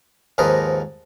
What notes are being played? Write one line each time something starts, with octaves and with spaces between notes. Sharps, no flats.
D#2 G#2 F3 A#4 B4 D#5